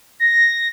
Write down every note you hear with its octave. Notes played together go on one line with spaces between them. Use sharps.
A#6